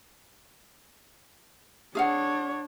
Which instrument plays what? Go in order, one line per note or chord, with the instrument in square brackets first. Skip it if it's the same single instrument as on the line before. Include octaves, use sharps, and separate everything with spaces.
[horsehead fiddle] D4 C#5 [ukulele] G#4 F5 F#5